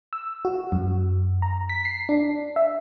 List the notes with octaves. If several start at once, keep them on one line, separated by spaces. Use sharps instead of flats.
E6
F#4
F#2
A#5
B6
C7
D4
E5